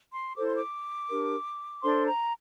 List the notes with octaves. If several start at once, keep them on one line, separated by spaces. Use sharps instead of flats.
C6
E4 A4 C5 D6
C6
D6
D4 G4 A#4
D4 A4 C5 C6
A#5